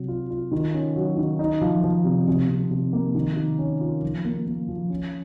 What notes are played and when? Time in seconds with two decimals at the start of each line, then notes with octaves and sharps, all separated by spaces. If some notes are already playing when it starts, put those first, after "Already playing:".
Already playing: C3 F#3
0.08 F4
0.30 F4
0.51 D#3
0.74 C#4
0.96 F#3
1.18 D#3
1.39 D#4
1.61 F3
1.84 F3
2.05 C3
2.27 C3
2.49 C3
2.71 C3
2.93 A#3
3.15 D#3
3.36 D#3
3.59 C#4
3.80 F4
4.02 F3
4.25 A#3
4.46 A#3
4.69 F3
4.90 C#4